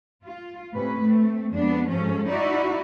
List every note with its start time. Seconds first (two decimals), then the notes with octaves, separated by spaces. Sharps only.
0.24 F4
0.73 A2 C3 C#4 B4
1.03 A3 C4
1.52 F2 G#3 B3 D4
1.90 G#2 F3 F#3 C#4 A4
2.29 D#4 E4 F#4 D5 E5